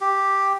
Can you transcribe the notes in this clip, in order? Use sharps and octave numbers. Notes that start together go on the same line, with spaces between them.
G4